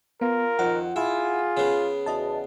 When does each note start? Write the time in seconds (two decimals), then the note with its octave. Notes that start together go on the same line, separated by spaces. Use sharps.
0.21 B3 F4 A#4
0.59 F2 D#3 F#5
0.96 E4 F4 G#4
1.57 C#3 B3
2.06 E2 F#4 D#5 A5